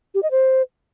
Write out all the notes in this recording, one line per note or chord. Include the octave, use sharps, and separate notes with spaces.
G4
D#5
C5